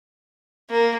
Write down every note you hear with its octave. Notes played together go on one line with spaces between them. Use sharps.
A#3